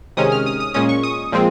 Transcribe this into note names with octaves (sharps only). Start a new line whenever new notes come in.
C3 D#3 G#3 C#4 D#6
F6
D#6
D#6
A#2 G#3 C#4 D#6
C#6
D#6
A#2 F3 G#3 C4